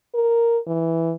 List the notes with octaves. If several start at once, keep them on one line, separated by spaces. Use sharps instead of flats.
A#4
E3